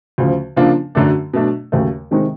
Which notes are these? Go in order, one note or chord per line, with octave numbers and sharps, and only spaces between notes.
D2 C#3 F3
C#3 F3 A#3 D4 F4
F#2 D3 F#3 A3 D4
B2 F#3 A3 D4
D#2 C#3 F#3 A3
C3 D#3 G#3 C4 D#4